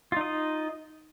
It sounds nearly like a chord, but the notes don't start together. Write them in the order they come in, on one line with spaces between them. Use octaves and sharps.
F4 D#4 D#5